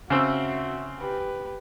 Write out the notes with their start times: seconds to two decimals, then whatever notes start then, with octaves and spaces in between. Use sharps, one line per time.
0.10 C#3 C4 F#4 E5 E6
0.98 G4 B4